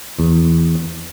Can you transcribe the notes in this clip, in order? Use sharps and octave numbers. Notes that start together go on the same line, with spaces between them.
E2